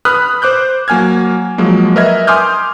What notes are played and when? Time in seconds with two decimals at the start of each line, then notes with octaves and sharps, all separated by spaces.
0.05 B4 B5 D#6 F6 F#6
0.42 C5 D6 F#6 G6
0.88 F#3 A#3 G#5 F6 G#6
1.58 F3 F#3 G#3 A#3
1.96 A#4 B4 D#5 E5 F6 G#6
2.27 G#5 C6 D6 D#6 F6 G6